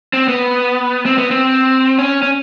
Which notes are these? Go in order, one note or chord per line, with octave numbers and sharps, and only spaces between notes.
C4
B3
C4
B3
C4
C#4
C#4